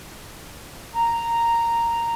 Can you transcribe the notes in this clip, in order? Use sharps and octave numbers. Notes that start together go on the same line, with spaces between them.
A#5